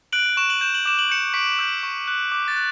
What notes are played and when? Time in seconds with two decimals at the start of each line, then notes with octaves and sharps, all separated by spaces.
0.13 F#6 D7 F#7
0.37 C#6 E7
0.50 F#7
0.61 G6 E7
0.75 F#7
0.86 D6 E7
0.99 F#7
1.10 G6 C#7 E7
1.34 C#6 B6 D7
1.59 E6 G6
1.83 C#6
2.08 F#6
2.32 D6
2.48 A6
2.56 F#6